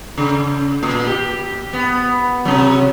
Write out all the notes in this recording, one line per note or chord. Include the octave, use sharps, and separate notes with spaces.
C#3
A#2
G4
B3
C3 F#3